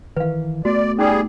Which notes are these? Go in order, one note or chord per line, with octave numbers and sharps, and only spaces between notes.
D#3 E3 B4 F5
A3 B3 F#4 D5
G3 C#4 D#4 G#4 D6